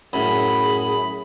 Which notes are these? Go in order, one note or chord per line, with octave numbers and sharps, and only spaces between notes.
F#2 A2 G#4 B5